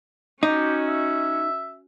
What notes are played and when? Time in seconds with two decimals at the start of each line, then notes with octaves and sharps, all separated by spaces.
0.43 C#4 D#4 F#4 G4
0.88 E5